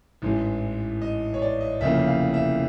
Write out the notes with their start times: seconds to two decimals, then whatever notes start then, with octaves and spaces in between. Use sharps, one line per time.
0.22 A1 G#2 E3 G#3
1.02 D#5
1.34 C#5
1.42 D5
1.61 D#5
1.81 F1 E2 C#3 F3 A#3 E5
2.07 F5
2.34 E5